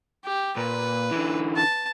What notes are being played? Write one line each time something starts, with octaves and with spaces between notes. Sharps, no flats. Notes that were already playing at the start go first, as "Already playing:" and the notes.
G4
A#2 B4
D3 E3
A5